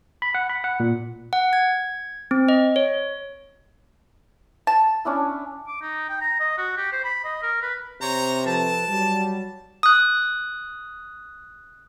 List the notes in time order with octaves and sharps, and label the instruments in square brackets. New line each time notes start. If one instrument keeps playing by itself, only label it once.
[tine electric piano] B5
F#5
B5
F#5
A#2
[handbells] F#5
G#6
C4
D#5
C#5
[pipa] A5
[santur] C#4 D4 E4
[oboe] D6
D#4
G5
A#5
D#5
F#4
G4
C5
B5
D#5
A#4
B4
[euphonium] C3 [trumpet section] C5 C#5 A#5
[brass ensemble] F3 A4 B4 [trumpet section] A5
[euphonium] F#3 [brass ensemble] G3
[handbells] D#6 F#6